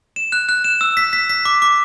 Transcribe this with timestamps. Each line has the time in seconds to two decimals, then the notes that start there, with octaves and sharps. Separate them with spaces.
0.16 E7
0.32 F#6
0.49 F#6
0.64 E7
0.81 E6
0.97 B6
1.13 B6
1.29 B6
1.45 D6
1.62 D6